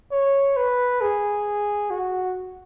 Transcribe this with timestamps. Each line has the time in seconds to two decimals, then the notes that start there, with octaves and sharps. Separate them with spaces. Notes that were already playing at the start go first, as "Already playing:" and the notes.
0.11 C#5
0.56 B4
1.01 G#4
1.90 F#4